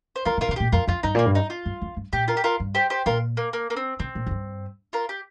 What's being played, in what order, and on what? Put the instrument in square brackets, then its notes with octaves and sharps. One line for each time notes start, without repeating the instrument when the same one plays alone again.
[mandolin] C5
[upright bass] D#3 [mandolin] F4 A#4
[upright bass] C3
[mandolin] F4 A#4
[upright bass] C3
[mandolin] F4
[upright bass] A#2 [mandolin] G4
[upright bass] F2 [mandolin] F4 A#4
[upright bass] F2 [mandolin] F4
[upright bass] G2 [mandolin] D#4
[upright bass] A#2 [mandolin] A#3
[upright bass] G2
[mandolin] D#4
F4
[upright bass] G2
F2
G2
[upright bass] A#2 [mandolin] G4
[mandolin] F4 A#4
G4
F4 A#4
[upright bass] G2
[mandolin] G4 C5
G4 C5
[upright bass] A#2 [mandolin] F4 A#4
[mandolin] A#3
A#3
A#3
C4
[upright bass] C3 [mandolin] C4
[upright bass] A#2
F2
G2
[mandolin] F4 A#4
G4